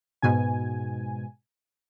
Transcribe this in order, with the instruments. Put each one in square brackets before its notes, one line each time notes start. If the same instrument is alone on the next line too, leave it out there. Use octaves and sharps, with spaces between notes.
[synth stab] G#2 B2 G#5